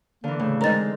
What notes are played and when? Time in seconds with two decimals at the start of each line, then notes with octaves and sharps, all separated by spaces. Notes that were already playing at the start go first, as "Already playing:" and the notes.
0.24 D3 E3 A#3
0.39 A2 C#3
0.61 G#3 C4 D#4 A#4 A#5 A6